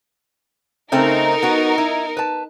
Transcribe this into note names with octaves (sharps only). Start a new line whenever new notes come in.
C#3 A3 C4 D#4 A#4
B3 F#4
E4
B4 A5